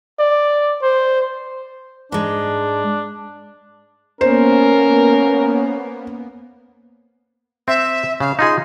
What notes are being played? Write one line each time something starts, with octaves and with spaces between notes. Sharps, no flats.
D5
C5
G#2 G#3 D4
A#3 B3 C#4 A#4 C5
C4 E5
C#3 F5
D#4 F4 G#4 C6